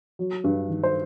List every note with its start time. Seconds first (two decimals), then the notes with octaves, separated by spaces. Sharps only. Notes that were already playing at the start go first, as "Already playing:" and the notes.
0.19 F#3
0.44 G2
0.69 D#3
0.83 C5